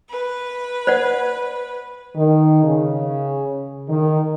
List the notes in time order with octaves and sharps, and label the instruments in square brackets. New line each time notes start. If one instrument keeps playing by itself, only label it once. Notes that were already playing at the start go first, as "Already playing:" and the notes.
[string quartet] B4
[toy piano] C5 D5 F#5
[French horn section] D#3
C#3
D#3